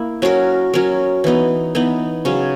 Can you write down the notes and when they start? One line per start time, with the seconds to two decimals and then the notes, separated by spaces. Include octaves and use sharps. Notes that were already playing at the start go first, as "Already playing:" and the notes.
Already playing: A#3 E4
0.22 F#3 C#4 F#4 A#4
0.73 F#3 C#4 F#4 A#4
1.24 E3 B3 D#4
1.75 E3 B3 D#4
2.25 C#3 F#3 C#4